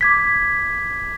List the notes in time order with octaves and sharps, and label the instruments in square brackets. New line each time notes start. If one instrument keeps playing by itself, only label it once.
[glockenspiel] D6 G#6 B6